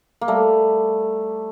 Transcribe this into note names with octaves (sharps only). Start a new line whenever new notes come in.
A#3
G3 A3